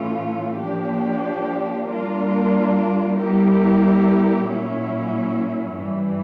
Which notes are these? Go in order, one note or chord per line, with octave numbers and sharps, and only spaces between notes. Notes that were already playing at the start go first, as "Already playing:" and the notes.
Already playing: A2 E3 A3 C#4 F4
F3 A#3 D4 G4
G3 A#3 D4 F4 A#4
G3 B3 E4 G4 A#4
A#2 F#3 A#3 C#4 E4
G2 E3 G3